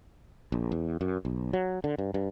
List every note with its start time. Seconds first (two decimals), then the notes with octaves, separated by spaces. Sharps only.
0.52 A#1
0.72 E2
1.01 F#2
1.25 B1
1.53 F#3
1.84 D3
1.98 G2
2.14 G2